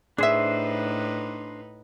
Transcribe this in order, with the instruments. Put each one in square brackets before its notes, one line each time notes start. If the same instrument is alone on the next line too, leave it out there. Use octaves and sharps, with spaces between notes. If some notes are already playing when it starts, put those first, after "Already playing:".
[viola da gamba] A2 D#4 B4 [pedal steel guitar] D4 C5 E6 [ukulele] G#4 E5